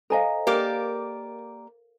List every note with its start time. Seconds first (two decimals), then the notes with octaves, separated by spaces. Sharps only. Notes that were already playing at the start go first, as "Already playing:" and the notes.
0.10 A4 C5 D#5 F5 G#5 A#5
0.47 A#3 G4 A#4 D5